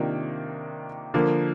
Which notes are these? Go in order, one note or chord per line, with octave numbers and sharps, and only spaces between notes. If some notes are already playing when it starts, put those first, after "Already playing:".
Already playing: C3 D#3 A#3 D4 F4
D3 F3 A#3